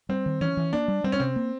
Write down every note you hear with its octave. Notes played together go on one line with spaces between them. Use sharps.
G3 C4
D#3
E3 C#4
E3
A#3 D4
G3
G3 C4
C#4
C3 C4
A#3